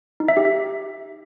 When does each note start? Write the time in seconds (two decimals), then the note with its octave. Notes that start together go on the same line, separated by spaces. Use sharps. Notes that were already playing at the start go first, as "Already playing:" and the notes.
0.20 D#4
0.28 E5
0.37 G4
0.45 E5